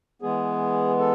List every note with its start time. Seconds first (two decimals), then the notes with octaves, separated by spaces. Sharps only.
0.22 E3 G#3 B3 G#4
0.99 A4